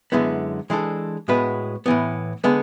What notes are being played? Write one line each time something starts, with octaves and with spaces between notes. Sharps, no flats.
F#2 D3 G#3 B3 E4
E3 G#3 D4 A4
A2 G#3 B3 F#4 B4
A2 E3 B3
D3 G#3 B3